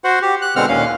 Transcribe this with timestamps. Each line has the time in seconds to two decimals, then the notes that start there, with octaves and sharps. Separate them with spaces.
0.04 F#4 C5 F#5
0.22 G4
0.42 F#6
0.56 B2 D3 G#3 C4 F#5 F6
0.69 D#2 A#2 C#4 F5